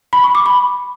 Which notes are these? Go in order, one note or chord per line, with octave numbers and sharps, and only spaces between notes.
B5
C#6
D6
B5